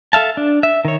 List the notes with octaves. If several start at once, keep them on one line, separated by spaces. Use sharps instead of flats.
A4 E5 F5 A5
D4
E5
D#3 C#5